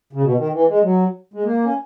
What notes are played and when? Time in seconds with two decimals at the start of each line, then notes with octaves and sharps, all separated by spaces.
0.13 C#3
0.22 B2
0.37 D#3
0.53 E3
0.68 G#3
0.83 F#3
1.34 G#3
1.44 A#3
1.64 C#4